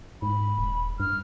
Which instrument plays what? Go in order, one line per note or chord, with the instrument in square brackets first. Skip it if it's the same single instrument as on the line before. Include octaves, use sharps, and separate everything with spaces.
[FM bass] G#2 [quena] B5
[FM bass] D#1
[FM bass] G2 [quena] F6